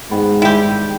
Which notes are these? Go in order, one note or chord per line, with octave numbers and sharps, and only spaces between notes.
G#2 D#3 B3
D#3 G3 G#3 E4 G4